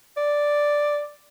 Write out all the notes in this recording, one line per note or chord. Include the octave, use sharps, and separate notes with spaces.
D5